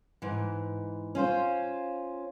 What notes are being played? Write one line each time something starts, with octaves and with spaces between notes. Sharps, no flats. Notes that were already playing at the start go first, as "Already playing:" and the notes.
G#2 E3
C#4 F4 C5